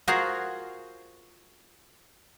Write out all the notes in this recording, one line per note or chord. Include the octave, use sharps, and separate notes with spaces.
F4 F#4 G#4 A#4 C5